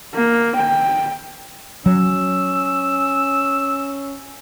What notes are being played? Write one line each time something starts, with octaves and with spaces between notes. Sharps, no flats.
A#3
G5
F#3 C#4 E6